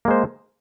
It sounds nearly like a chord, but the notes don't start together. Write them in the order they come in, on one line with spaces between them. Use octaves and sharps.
A#3 G#3 C5